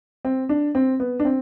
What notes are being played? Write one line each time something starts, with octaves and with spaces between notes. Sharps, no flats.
C4
D4
C4
B3
D4
C4